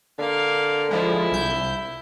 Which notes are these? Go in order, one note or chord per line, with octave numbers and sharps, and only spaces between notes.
D3 A#3 F5
F3 G#3 E4
C2 G6